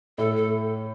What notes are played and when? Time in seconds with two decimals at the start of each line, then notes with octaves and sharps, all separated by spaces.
0.18 A2 A4
0.36 A4